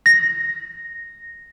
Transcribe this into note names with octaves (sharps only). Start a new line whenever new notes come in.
A#6